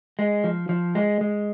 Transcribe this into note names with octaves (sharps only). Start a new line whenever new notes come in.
G#3
F3
F3
G#3
G#3